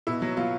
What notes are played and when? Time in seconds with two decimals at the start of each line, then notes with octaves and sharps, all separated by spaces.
0.07 B2 E4
0.22 F#3
0.37 F#3 F4